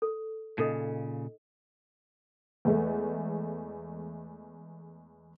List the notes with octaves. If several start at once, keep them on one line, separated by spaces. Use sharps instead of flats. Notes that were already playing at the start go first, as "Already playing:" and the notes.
A4
A#2 C#3 D#4 A4 D#5
E2 G#3 A3